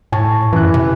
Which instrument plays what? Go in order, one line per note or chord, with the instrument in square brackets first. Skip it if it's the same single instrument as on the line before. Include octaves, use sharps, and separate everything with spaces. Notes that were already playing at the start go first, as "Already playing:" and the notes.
[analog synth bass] A2 [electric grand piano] G#5 A5 C#6
[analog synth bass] F#2 [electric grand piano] E3 F#6
[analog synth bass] C3